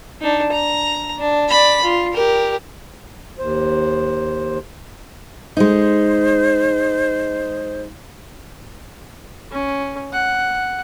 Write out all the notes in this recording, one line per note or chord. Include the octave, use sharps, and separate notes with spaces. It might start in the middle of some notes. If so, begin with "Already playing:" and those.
D4 D#4
A#5
D4
D5 B5
F4
G4 A#4
D#2 C5
G#3 D#4 C5
C#4
F#5